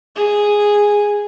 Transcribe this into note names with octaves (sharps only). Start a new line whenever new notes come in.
G#4